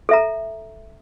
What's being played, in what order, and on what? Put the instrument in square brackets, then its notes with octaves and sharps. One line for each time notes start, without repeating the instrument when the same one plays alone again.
[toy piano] A4 E5 A#5